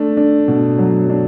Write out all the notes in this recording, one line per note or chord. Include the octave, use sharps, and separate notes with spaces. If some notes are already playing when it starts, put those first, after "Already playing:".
Already playing: A3 D4
D4
B2
F#3
D4